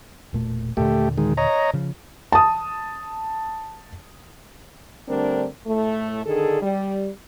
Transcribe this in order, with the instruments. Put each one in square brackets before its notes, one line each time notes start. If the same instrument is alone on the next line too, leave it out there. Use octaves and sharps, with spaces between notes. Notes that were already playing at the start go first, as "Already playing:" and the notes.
[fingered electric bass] E1 A#2 A3
[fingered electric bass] D#2 A#2 D3 [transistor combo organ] A3 G4
[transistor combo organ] D#3 G#3
C#5 D#5 A#5
[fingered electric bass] C#3 F3
[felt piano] A5 D#6
[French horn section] D3 G3 A3 C4 D4 A#4
A2 A3
D3 D#3 D4 G#4 A4
G3